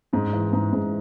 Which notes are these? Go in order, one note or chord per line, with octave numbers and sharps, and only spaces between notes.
G#2 D#4
E3
G#2
G#2